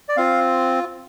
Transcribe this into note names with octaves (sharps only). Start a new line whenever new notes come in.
D5
C4 F4 F5